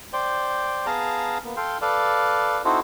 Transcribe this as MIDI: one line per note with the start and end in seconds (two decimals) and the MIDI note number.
0.13 0.86 72
0.13 0.86 74
0.13 0.86 79
0.86 1.38 59
0.86 1.38 68
0.86 1.38 77
0.86 1.38 81
0.86 1.38 82
1.45 1.56 58
1.45 1.56 59
1.57 1.78 69
1.57 1.78 77
1.57 1.78 79
1.57 1.78 84
1.82 2.62 69
1.82 2.62 71
1.82 2.62 74
1.82 2.62 77
2.65 2.80 60
2.65 2.80 63
2.65 2.80 64
2.65 2.80 66
2.65 2.80 69
2.65 2.80 72